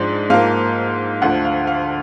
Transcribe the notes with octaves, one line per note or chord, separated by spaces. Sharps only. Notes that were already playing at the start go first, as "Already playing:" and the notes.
Already playing: G#2 F3 G#3 D4
G#2 F3 A#3 F5
D2 D3 F3 F#5
F5
F5